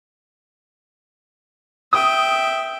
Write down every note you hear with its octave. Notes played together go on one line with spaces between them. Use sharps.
E5 G5 D#6